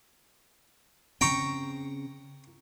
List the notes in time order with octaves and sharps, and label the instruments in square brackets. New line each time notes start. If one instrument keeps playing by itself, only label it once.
[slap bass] C#3 C4 [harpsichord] G5 A#5 C#6